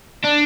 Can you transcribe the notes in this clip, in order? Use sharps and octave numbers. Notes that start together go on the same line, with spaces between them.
D4